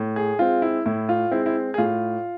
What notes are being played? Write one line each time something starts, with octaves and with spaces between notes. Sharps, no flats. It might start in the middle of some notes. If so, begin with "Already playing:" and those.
Already playing: A2
G#4
G#3 C4 F4
E4
A2 E4
F4
G#3 C4 E4
E4
G#4
A2 F4